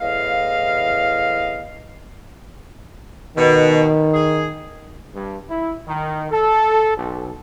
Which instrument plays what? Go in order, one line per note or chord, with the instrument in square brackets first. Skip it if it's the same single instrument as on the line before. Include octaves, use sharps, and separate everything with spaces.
[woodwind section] E2 A2 D#5 F5
[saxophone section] B2 [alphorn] D#3
[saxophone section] G#4
[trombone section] G2
E4
D#3
A4
B1